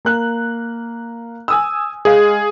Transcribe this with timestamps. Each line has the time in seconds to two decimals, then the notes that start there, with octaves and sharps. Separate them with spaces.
0.05 A#3 F#6
1.48 G#5 D#6 E6
2.05 G#3 G#4 F5